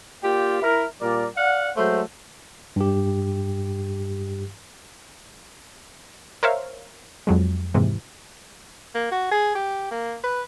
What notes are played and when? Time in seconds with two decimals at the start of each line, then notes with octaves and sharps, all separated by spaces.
0.23 A#3 F4 G4 D5 G5
0.62 E4 A#4
1.01 A#2 G3 A#4 D5
1.37 D5 F5 F#5
1.77 F#3 G#3 A3 C5
2.76 G2 G4
6.43 A#4 C5 C#5 E5 F5
7.27 F2 F#3 G#3
7.74 D#2 G#2 C3 E3
8.95 A#3
9.11 F#4
9.31 G#4
9.55 G4
9.91 A#3
10.24 B4